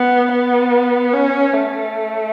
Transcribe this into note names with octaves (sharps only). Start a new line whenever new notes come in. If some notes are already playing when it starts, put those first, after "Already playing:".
Already playing: B3
B3
C#4
A3